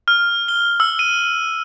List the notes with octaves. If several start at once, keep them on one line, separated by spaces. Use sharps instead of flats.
F6
G7
E6
D#7